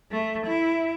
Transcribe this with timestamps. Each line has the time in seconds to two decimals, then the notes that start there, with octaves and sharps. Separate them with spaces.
0.11 A3
0.47 E4